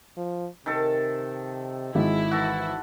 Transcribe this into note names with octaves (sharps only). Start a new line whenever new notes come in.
F3
C3 D#3 A4
G#1 G#3 E4
E3 F#4 A4